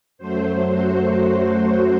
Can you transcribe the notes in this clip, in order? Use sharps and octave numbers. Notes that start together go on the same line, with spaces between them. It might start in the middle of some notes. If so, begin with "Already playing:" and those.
F#2 F#3 A3 C5
F#4